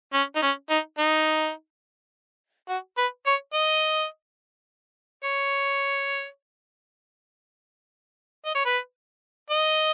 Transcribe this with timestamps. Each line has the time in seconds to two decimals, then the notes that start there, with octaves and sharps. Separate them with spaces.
0.14 C#4
0.36 D#4
0.42 C#4
0.70 D#4
0.99 D#4
2.69 F#4
2.98 B4
3.26 C#5
3.54 D#5
5.24 C#5
8.45 D#5
8.55 C#5
8.66 B4
9.50 D#5